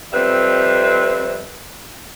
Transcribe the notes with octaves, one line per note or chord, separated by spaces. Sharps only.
F2 G3 C4 B4 E5